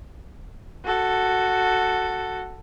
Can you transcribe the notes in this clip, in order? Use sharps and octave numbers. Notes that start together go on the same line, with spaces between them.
F#4 A4